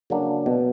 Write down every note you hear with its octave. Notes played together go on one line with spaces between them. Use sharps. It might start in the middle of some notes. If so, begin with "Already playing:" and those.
C#3 F#3 A#3 D4
B2